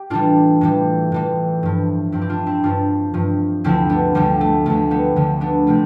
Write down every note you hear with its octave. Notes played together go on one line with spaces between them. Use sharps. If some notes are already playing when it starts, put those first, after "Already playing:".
Already playing: G4
A2 E3 G3 D4 F4
A2 E3 G3
A2 E3 G3
G2 F3
G2 F3 C4 E4
G4
D4 F4
C4 E4
G2 F3 D4 F4
G2 F3
D2 D3 F3 C4 E4
B3 D4
D2 D3 F3 G3
A3
D2 D3 F3 A3
G3 B3
D2 D3 F3
B3 D4
C3 F3 A3 C4